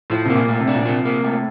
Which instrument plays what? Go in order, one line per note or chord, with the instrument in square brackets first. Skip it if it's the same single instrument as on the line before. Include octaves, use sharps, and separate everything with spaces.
[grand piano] A2 [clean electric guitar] F3
[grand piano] C3 [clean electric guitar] A#3
[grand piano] A#2
[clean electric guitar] A2
[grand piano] C3
[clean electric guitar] D4
[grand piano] A#2
[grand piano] C3 [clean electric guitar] F3
[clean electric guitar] A#3
A2